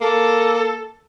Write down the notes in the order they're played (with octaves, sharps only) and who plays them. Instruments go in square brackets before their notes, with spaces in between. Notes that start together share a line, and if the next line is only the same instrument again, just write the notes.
[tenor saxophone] A#3 [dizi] A4